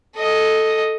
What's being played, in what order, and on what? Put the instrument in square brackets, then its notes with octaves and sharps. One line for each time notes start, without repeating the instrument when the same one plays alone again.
[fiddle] A4 D#5